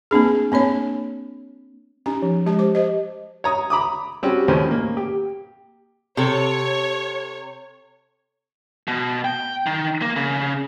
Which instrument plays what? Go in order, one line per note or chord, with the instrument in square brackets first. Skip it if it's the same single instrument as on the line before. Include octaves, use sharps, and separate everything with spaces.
[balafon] A#3 C4 D4 G#4
A#3 C4 D4 C#5
C#4 D#4 G4 A#5
F3
G#3 G4 A5
C5 D6
G4 C5 D#5
[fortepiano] C#5 A#5 D#6
A#5 B5 D6 D#6
G3 C4 C#4 F#4
D#2 A2 C#4 C5
A#3
G4
[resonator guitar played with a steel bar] C3 A4 [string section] C#5
[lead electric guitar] B2
G5
D#3
A#3
C#3